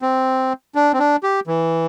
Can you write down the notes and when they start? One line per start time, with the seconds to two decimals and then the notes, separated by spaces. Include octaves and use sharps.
0.02 C4
0.75 D4
0.93 C4
0.99 D4
1.23 G4
1.47 E3